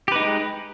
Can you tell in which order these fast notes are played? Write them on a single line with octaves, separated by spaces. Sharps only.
G4 B4 D#4 G#3